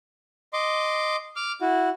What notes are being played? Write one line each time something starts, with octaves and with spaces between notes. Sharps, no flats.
D#5 C6 D6
D6 F6
E4 F#4